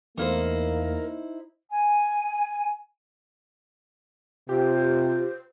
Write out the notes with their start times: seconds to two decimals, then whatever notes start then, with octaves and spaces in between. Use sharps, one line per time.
0.17 E2 A3 A#3 D#4 E4 A#4 C5 F5
1.70 G#5
4.49 C3 F4 G4 C5